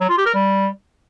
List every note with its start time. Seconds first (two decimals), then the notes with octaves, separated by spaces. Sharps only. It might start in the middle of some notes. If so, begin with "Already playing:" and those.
0.01 F#3
0.09 F4
0.18 G4
0.26 A#4
0.35 G3